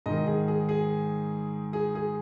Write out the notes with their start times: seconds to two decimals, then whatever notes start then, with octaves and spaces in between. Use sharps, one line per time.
0.06 G#2 D#3 D#5
0.27 G#4
0.48 G#4
0.69 G#4
1.73 G#4
1.95 G#4